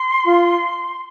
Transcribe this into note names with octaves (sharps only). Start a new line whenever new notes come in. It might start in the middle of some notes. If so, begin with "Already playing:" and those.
Already playing: C6
F4